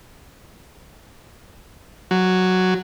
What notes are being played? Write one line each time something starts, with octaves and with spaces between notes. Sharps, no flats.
F#3